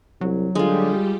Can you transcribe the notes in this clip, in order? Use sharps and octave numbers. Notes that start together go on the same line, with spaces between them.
C2 F#3
D3 G3 G#3 F4 G4